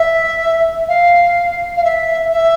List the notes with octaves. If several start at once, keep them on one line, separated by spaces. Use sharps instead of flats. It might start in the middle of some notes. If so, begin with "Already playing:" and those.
Already playing: E5
F5
F5
E5
E5